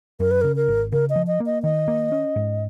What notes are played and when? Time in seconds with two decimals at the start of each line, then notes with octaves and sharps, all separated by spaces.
0.20 F#2 A#4
0.31 B4
0.41 C#3 A#4
0.56 A#4
0.68 G#1
0.92 C#3 A#4
1.10 D#5
1.16 F3
1.27 D#5
1.40 A#3
1.46 D#5
1.63 D#3 D#5
1.88 A#3
2.12 C#4
2.36 G#2